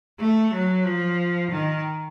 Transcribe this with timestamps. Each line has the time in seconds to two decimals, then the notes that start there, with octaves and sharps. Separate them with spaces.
0.20 A3
0.53 F#3
0.86 F3
1.50 D#3